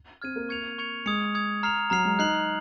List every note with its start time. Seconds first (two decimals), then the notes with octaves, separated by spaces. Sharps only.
0.22 C4 F6 G#6 D#7
0.36 A#3
0.49 C#6 G#6 C#7 F7
0.78 C#6 G#6 C#7 F7
1.06 G#3 D#6 G#6 C#7 F7
1.35 D#6 G#6 C#7 F7
1.63 A#5 F6 C7 F7
1.90 F#3 A#5 F6 C7 F7
2.05 G#3
2.19 D#4 F#6 C7 F#7